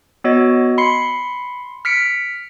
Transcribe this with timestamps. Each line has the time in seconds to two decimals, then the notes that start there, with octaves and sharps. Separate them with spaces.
0.24 B3 F#4 C#5 D#5
0.78 B5 C6 C7 C#7
1.85 F6 B6 C#7 D7